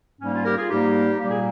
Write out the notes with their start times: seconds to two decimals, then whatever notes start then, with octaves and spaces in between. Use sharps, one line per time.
0.20 G#2 G3 A#3 C#4
0.33 C#4 F4
0.45 G4 A#4
0.57 F4 G#4
0.69 G#2 G3 A#3 D#4 G4
1.19 A#2 G3 A#3 G4
1.30 G#4